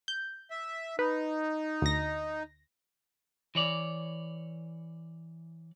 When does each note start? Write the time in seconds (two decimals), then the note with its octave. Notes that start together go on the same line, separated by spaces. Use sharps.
0.08 G6
0.51 E5
0.99 D#4 B4
1.82 D2 A#6
3.55 E3 C#5 D5